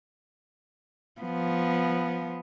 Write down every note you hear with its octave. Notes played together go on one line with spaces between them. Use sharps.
F3 B3